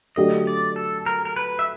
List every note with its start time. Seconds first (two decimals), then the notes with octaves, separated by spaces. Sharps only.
0.16 D3 F#3 A3 D4 G4 D#5
0.47 D5
0.76 A4
1.06 A#4
1.25 A#4
1.36 B4
1.59 E5